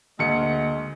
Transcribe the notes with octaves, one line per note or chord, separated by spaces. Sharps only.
D2 D3 G#3 A#3 D#5 C#7